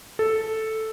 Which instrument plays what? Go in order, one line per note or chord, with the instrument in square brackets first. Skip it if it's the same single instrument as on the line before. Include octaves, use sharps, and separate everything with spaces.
[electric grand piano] A4